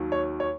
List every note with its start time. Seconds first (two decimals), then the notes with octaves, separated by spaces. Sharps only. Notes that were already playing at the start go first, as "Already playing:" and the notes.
Already playing: D#2 D#3 F#3
0.12 C#5
0.40 C#5